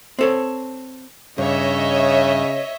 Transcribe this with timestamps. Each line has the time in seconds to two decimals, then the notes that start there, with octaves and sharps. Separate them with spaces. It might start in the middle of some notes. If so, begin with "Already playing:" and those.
0.19 C4 A4 C#5
1.38 G2 C#3 C#5 D#5 E5